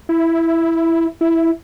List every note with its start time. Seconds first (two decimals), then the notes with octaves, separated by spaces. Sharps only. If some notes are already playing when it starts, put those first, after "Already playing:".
0.09 E4
1.21 E4